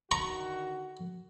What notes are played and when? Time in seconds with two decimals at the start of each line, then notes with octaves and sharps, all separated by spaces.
0.11 D3 D#3 F#4 A#5 C#6